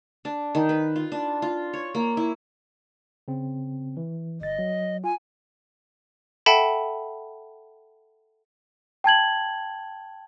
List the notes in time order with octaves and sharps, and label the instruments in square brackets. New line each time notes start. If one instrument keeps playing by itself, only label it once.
[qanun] D4
D#3
B4
F4
D4
F4
C#5
A#3
E4
[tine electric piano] C#3 C4
E3
[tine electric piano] G1 A6 [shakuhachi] D#5
[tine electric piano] F#3
[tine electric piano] F4 [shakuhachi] G#5
[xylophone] A4 E5 F#5 G5 A5 B5
[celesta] G5 A5 G#6 F#7